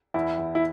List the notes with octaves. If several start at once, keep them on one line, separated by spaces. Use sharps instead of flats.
E2 E4
E2
E4